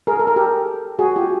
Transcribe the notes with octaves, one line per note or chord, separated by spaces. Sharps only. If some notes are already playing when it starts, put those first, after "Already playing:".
G#4 A#4
A4
A#4
G4 A4
F#4 G#4
F4 G4